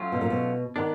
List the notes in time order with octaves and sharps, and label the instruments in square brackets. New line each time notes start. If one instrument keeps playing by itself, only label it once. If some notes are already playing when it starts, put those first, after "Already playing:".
Already playing: [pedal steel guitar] F#3 A3 C#4 F4
[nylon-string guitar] B2
A#2
B2
[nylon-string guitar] D#3 [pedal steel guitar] B3 D4